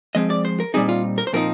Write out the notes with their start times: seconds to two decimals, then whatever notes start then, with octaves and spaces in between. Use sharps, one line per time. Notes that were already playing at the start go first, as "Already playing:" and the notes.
0.15 F3 G#3 C4 D#5
0.30 D5
0.45 C5
0.60 A#4
0.74 A#2 G3 C4 D#4 G#4
0.89 F4
1.18 A#4
1.27 C5
1.33 A#2 F3 C4 D#4 A#4